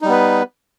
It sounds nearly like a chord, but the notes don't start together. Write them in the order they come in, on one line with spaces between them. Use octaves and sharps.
D#4 G3 B3 B4